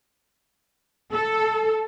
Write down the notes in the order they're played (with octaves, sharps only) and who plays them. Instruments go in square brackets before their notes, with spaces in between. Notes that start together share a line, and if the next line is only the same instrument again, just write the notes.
[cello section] A4